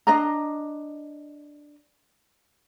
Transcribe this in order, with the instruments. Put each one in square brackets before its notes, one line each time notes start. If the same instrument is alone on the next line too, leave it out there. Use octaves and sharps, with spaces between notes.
[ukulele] D4 D#5 A#5